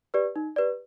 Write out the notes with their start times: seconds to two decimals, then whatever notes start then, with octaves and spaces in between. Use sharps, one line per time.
0.14 G4 B4 D5
0.36 D#4
0.56 G4 B4 D5